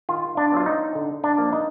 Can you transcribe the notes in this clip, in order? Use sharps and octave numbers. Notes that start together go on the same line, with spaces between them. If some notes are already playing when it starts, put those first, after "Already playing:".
D#3 F4
D4
F#3 B3 F4
D#4
D3
D4
F3 A#3
D#4